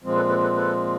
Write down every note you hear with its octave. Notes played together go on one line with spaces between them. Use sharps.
A#2 F3 G#3 C4
A4 B4
A4 B4
A4 B4
A4 B4